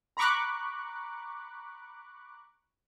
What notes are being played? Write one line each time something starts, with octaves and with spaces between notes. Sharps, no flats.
A#5 B5 C#6 D6 F#6